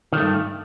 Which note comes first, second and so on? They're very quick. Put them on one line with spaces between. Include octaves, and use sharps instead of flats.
D#3 A3 G2